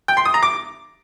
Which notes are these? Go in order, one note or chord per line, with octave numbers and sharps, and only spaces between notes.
G5
C6
D#6
A#5
D6